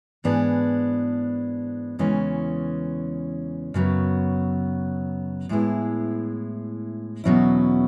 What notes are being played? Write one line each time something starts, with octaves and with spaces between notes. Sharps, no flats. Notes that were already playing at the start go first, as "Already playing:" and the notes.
G#2 E3 B3 D4 G#4
E2 C#3 E3 G#3 C#4
F#2 C#3 F#3 B3
A2 G#3 B3 E4 G#4
E2 B2 F#3 C#4 E4